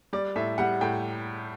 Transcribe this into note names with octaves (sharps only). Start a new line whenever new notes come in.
G3 D5
A2 E5
G3 F#5
A2 G5